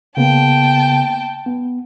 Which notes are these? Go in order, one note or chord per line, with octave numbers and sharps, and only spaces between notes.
C#3 A#3 B3 G5 A5
B3